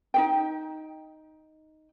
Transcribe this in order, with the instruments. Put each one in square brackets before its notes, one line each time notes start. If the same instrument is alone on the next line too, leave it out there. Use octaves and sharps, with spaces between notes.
[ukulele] D#4 G#4 G5